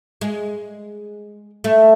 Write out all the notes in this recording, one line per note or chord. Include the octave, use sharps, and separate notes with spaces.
G#3
A3